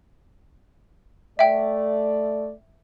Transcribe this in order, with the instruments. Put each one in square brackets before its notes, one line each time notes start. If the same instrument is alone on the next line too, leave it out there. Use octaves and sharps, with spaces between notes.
[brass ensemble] A3 D5 [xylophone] E5 G5